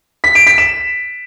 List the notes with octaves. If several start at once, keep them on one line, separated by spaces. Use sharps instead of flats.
B6
D7
B6
E7